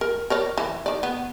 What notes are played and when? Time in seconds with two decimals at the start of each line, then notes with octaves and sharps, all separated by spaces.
0.01 A#4
0.30 A#4 C#5 D5
0.58 E3
0.86 D#3 D5
1.03 B3